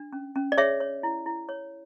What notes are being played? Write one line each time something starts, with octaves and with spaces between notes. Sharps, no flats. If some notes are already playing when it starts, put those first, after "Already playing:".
Already playing: D4
C#4
C#4
D5
G#4 C#5 E5
C#5
E4
E4
C#5